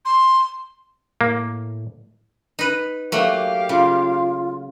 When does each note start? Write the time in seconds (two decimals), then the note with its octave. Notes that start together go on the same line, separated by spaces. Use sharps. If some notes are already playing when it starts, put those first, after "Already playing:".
0.05 C6
1.21 A2 A#3
2.59 D#4 B4
3.12 F#3 A3 A#3 G4 F5
3.69 C#3 F4